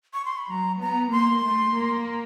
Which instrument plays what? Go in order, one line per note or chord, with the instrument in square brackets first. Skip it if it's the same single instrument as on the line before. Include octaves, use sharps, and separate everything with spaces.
[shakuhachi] C#6
C6
B5
[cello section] F#3 [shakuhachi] A#5
[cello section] B3 [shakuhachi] A#5
[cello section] A#3 [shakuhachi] C6
[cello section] A3
A#3